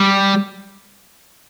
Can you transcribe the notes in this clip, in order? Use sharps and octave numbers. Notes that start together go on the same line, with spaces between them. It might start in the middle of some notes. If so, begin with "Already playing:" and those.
Already playing: G3